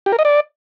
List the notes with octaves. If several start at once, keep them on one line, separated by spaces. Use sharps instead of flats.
G4
A#4
D#5
D5